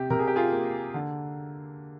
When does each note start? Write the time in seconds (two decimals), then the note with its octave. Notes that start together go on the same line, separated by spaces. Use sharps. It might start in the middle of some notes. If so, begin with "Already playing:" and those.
Already playing: C3 G4
0.10 C3 A#4
0.19 G#4
0.27 G4
0.36 F4 G#4
0.52 A#3
0.94 D3